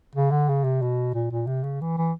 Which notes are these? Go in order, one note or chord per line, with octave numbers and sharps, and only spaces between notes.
C#3
D3
C#3
C3
B2
A#2
A#2
C3
C#3
E3
E3